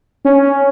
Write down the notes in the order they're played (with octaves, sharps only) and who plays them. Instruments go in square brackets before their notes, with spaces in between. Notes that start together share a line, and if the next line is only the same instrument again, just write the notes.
[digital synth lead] C#4